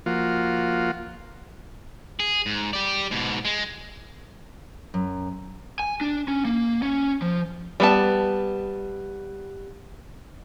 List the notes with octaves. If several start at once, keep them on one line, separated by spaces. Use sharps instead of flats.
F3 A#3 F4 F#4
G#4
G#2
G4 D5
G#2 B2
G#3
F#2
G#5
D4
C#4
A#3
C#4
F3
G3 B3 A5